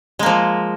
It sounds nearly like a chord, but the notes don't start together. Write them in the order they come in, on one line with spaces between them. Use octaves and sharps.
G#3 A#3 F3